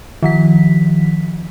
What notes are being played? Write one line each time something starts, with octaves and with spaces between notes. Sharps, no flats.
D#3 F3 B6